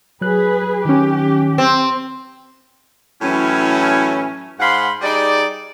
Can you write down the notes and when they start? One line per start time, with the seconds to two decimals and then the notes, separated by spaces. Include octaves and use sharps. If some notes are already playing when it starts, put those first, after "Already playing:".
0.21 F#3 G#4 B4 F#6
0.85 D#3 C#4 G4
1.58 C4
3.22 A2 E3 F#3 C#4
4.60 G#2 F5 F#5 B5 C6
5.02 G3 D#4 G#4 D5